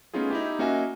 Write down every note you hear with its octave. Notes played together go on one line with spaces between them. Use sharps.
A3 B3 C#4 D#4 F4 G#4
D#4 E4 G4
A#3 C#4 F#4 D#5 E5 G#5